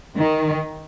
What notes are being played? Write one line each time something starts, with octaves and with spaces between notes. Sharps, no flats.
D#3